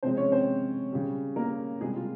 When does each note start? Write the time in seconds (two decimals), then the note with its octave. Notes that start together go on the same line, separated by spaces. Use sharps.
0.03 C3 F3 G#3 C4 C5
0.17 C#4 C#5
0.32 C4 C5
0.92 C#3 G3
1.36 A#3 A#4
1.81 C3 G3 G#3 G#4
1.96 F4